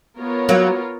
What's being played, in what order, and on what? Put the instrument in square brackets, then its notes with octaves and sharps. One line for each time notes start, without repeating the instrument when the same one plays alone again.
[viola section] B3 F4 A#4 C#5
[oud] F#3 A#3